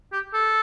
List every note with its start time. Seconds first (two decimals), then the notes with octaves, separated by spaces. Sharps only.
0.13 G4
0.34 A4